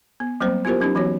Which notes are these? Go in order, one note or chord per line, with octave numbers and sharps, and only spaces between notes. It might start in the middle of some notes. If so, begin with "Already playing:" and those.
B3
F#3 G3 A#3 C4 C5
B3 E4 F4 G4 A#4 C5
F#3 C#4 D#4 G4
E3 F#3 B3 F#4 C#5